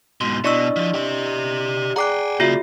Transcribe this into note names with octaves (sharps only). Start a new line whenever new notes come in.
G#2 B2 C6
B2 D4 E4 D5 D#5 C#6 E6
F3
G4 E5
G#4 D5 F#5 G5 A#5 D6 F#6 C7
C#3 A#3 F4 F#4 E5